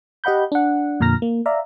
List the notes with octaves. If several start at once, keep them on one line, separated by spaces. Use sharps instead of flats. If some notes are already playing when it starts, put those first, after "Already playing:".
G4 D#5 F#5 B5 G6
D4 F#5
F2 A#2 D3 A#5 F6 A#6
A#3
D5 E5 F5 A#5